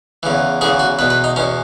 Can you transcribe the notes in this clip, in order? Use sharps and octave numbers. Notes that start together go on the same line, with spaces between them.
E2 C#3 E3
E2 C#3 E3 G#4
F#4
E2 B2 B4
B4
D#4
E2 B2 C#4